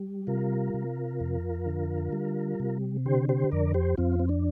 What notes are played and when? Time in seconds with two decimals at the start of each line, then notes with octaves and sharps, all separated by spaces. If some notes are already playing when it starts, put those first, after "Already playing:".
Already playing: G3
0.27 C3 F4 A#4
0.74 C3
1.20 F2
1.66 D3
2.12 G3
2.60 C3
3.05 D3 G4 C5
3.29 G4 C5
3.51 F2 A#4 D5
3.74 G4 C5
3.97 F2 C4 F4
4.19 C4
4.29 D4